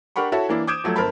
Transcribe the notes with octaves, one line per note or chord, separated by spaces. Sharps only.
D4 G4 A#4 F#5 B5 C#6
E4 F#4 A4 C#5 E5 A5
E3 A#3 D4 E4
D6 D#6 G6 G#6 D7 E7
F3 F#3 A3
G1 A#4 C5 A5 B5